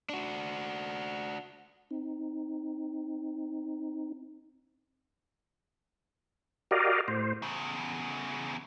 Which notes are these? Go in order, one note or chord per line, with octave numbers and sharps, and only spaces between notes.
D4 F#4
C4 D#4
F#4 G4 A#4 D5 D#5 F5
A2 C5
E2 C#3